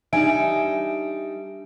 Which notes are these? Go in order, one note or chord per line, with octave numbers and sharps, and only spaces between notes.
G3 D4 D#4 A4 E5 G#5 D7